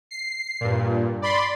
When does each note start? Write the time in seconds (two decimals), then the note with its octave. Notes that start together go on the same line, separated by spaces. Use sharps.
0.11 C7
0.61 G2 A#2
1.22 D5 B5 C6